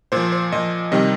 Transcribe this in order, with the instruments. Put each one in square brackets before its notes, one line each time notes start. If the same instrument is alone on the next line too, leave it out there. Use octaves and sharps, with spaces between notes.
[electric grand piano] A#2 F3 C5
C5
A#2 F3 D#5
C3 D#3 G3 D#5